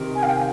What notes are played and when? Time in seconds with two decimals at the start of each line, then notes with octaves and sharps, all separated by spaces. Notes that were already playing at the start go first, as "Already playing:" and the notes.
Already playing: C3 D#3
0.16 G#5
0.23 F5
0.27 G5